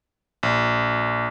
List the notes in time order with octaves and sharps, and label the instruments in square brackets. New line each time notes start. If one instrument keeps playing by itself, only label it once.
[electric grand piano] A#1